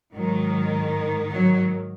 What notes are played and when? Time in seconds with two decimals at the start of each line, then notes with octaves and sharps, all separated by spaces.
0.15 G#2 D#3 F#3
1.31 F#3